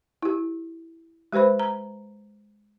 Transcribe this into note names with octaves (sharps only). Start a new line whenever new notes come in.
E4 G4
G#3 G4 B4 C5 B5
A#5